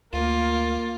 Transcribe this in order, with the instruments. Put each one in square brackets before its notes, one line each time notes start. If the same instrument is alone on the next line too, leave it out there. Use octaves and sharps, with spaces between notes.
[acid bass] D2 [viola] A#3 A#4 [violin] F4